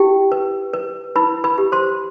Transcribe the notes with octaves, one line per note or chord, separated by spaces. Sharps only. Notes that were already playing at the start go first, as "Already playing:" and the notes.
Already playing: E4 G4 G5
B4
B4
E4 B4 B5
B4 B5
G4
C5 C6